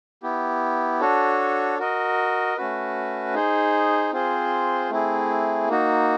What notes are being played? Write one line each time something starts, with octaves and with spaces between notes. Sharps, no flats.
B3 E4 G4
D4 F#4 A4 C#5
F#4 A#4 D#5
A3 C#4 F#4 B4
D#4 G#4 C5
C4 F4 G#4 C5
A3 C4 E4 G#4
A#3 D#4 F#4